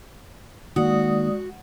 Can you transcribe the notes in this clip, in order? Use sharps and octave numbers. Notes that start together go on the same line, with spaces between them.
D#3 G#3 A#3 F#4 D5 D#6